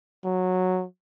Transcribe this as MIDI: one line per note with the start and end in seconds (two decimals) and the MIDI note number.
0.24 0.85 54